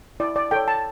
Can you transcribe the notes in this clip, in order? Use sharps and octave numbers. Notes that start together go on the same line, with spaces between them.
E4 D5
D5
A4 C#5 G5
A5